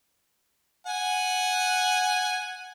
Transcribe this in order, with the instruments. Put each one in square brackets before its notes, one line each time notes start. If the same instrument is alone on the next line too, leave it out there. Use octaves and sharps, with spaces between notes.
[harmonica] F#5 G#5